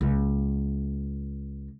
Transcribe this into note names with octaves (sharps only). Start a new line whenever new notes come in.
C#2 A#3